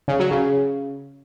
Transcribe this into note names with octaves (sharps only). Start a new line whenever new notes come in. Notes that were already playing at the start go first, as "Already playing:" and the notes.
C#3
F#3
C#3